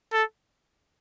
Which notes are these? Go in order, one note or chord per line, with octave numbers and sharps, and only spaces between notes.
A4